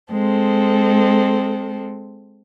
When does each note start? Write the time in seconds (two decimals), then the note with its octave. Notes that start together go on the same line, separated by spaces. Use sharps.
0.12 G#3 C4 A4